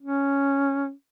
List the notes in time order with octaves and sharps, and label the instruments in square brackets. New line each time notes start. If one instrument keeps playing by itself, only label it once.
[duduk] C#4